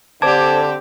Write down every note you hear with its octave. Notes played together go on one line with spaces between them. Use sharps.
D3 C4 G4 C5 A5 D6 G#6